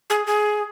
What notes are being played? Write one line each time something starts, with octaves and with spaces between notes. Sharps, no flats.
G#4
G#4